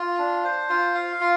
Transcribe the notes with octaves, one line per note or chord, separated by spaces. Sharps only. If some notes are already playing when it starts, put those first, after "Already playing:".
Already playing: F4
D4
C5
F4
F5
F4